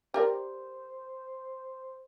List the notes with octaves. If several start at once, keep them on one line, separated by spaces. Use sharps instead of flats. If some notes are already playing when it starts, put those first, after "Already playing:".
G4 A#4 C5 D5